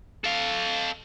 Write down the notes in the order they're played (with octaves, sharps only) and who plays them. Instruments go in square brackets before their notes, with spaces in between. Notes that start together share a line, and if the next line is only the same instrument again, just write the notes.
[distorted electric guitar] A4 F5